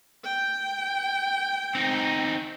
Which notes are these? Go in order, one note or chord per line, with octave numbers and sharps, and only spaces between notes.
G5
C4 D#4